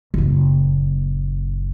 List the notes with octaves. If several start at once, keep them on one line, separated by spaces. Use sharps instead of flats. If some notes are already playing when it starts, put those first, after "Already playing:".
F#1 A#2